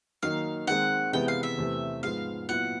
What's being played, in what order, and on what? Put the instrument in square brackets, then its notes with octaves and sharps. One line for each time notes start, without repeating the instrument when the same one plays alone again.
[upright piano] D#3 F#3 A#3 D#4 [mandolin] F5
[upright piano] D#3 G#3 C4 [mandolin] F#5
[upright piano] C3 E3 G#3 B3 [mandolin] G5
[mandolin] F5
E5
[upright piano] E2 C3 E3 A3 C4
[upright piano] G#2 F3 G#3 B3 [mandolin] F5
[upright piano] A#2 F#3 B3 E4 [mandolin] F#5